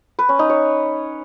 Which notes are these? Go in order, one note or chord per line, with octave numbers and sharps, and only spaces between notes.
B4
C#4
D#4
C#5